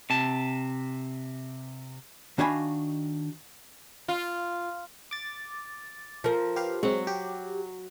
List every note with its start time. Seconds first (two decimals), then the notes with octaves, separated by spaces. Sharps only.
0.10 C3 A5
2.38 D#3 D4 F#4 F5 G#5 B5
4.08 F4
5.11 D6 A6
6.24 F3 A#4
6.56 G4 B4 F5
6.83 F#3 G#3 C4
7.07 G4